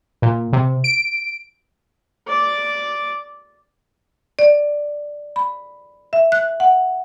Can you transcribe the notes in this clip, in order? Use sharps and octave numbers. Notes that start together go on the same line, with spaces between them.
A#2
C3
D7
D5 D6
D5
B5
E5
F#6
F#5